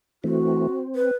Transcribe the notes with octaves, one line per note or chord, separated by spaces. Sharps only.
E3 A3 C4 F#4
C4
B4